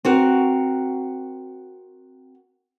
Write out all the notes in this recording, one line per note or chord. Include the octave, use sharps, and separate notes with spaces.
C4 F#4 A#4